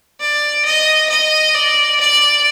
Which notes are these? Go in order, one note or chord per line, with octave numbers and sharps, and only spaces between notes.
D5
D#5
D#5
D5
D5